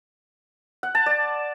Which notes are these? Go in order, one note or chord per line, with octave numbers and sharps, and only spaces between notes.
F#5
A5
D5